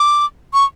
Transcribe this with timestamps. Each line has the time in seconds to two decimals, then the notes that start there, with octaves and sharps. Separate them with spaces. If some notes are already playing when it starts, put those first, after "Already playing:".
Already playing: D6
0.53 C#6